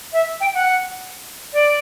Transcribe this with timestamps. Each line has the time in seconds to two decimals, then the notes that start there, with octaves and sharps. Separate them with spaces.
0.13 E5
0.41 G5
0.55 F#5
1.53 D5